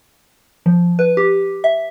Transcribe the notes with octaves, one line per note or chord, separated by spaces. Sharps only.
F3
B4
G4
E5